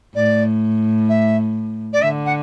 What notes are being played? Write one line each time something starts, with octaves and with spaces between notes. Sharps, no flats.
A2 D5
E5
D5
D3 E5
F#5